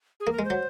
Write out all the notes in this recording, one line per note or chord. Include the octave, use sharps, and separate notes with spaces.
G#4
A#3
A#4
G#3
C5
F#3